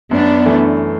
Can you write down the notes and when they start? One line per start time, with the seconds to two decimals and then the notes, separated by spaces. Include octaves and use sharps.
0.11 F#2 B3 D4
0.46 E3 A3